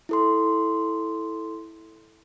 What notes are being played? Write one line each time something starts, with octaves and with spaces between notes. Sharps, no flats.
E4 A4 C6